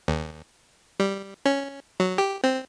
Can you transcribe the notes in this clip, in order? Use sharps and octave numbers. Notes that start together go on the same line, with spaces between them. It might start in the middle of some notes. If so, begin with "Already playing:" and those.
D#2
G3
C#4
F#3
G4
C4